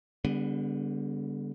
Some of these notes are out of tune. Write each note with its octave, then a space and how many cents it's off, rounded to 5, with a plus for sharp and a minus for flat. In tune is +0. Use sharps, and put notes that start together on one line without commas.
D3 -20 G3 +30 B3 +0